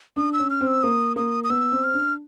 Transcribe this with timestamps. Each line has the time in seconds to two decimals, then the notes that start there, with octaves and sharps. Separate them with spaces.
0.16 D4 D#6
0.33 E6
0.39 C#4
0.50 F6
0.61 C4
0.67 E6
0.83 A#3 D#6
1.16 A#3 D#6
1.44 D#6
1.50 B3 E6
1.72 C4
1.84 F6
1.94 D4